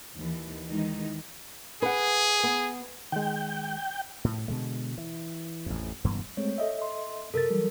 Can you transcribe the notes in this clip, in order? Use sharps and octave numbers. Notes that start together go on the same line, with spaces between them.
D#2 E3
D#3 E3 G#3 D#4
G#4 B4 F#5
B3
D#3 G#3 G5
A2
B2 D3 G#3
E3
A1 F2
F#1 G2 E3 B3
G#3 A3 C4 C#5
A4 D#5 E5
C6
F#2 C3 A4 A#4 A6
E3 F#3 G3